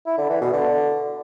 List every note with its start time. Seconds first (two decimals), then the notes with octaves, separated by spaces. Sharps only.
0.06 E4
0.18 D3
0.30 E3
0.41 B2
0.53 D3